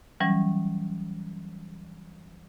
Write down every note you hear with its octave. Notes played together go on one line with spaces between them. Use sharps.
E3 F#3 G3 C#4